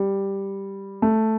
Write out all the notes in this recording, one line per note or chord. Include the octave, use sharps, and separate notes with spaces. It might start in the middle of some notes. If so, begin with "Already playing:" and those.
Already playing: G3
A3